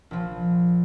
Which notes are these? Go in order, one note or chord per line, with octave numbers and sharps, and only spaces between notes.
A#1 F3